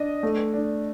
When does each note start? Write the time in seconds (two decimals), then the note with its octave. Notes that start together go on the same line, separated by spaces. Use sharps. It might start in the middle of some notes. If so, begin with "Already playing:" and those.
Already playing: D4 D#5
0.23 A3
0.54 D4